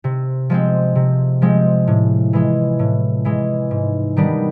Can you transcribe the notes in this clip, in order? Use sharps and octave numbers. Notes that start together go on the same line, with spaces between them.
C3
F3 G#3 C4
C3
F3 G#3 C4
A2
E3 G#3
A2
E3 G#3
G#2
D#3 G3 B3 D4